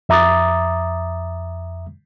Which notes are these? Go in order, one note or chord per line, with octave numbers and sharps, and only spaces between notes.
F2 E5 A#5 D6 D#6 A6